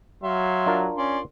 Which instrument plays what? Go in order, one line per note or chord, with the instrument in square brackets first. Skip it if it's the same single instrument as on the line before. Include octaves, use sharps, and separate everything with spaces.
[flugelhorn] F#3 [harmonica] E5 F5 C6
[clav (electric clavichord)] D4 F4 A#4
[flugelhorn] C#4 [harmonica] D5 C6